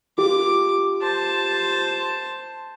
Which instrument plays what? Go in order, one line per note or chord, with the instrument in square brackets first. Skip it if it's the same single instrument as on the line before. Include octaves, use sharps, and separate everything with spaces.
[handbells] F4 G4 [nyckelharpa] D6
[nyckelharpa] C5 A5